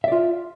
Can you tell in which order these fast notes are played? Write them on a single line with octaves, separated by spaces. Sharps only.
E5 D5 F4